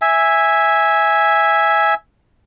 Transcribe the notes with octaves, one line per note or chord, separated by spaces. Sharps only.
E5 G#5